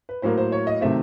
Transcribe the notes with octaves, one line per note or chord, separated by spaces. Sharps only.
B4
A2 F#3 A#3 C5
C5
C#5
D#5
C3 D#3 F#3 A3 C4 E5